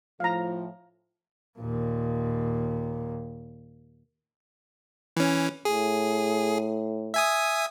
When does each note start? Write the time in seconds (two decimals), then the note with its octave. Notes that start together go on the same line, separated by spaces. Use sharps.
0.20 A2 F3 F5 A#5
1.60 D#2 A#2
5.17 E3 C#4
5.65 A2 G#4
7.14 E5 G#5 D#6